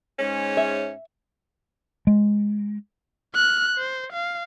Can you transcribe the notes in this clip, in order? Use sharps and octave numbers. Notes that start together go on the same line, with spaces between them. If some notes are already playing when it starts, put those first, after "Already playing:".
G#2 G#3 C#4
E5
G#3
F6 F#6
C5
F5